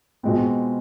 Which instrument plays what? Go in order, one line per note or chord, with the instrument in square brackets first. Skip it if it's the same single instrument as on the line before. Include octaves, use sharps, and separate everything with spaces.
[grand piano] B2 G#3 C4 F4